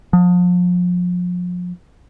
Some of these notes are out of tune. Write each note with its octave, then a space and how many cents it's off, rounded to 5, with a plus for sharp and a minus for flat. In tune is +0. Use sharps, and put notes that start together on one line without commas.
F3 +35